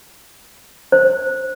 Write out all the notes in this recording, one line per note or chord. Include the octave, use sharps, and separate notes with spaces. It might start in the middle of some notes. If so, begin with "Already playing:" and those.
C5